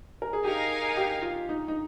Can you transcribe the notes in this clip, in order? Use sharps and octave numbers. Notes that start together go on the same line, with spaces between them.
A#4
G#4
D#4 G4 A#4 F5 G#5
G4
F4
D#4
D#4